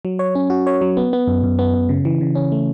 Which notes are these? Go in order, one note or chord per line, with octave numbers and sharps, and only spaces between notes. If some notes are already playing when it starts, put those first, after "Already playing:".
F#3
C#5
C#4
F#4
C#5
F#3
B3
B3
F#2
F#2
B3
F#2
C#3
E3
C#3
C#4
A3